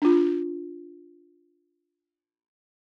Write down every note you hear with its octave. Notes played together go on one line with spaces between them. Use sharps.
D4 F4